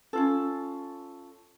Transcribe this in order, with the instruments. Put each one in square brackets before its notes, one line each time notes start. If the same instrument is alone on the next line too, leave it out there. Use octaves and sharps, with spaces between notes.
[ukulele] C#4 F4 A4